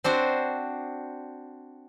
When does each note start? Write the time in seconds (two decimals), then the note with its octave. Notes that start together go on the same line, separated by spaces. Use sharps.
0.04 C4 D4 F#4 C5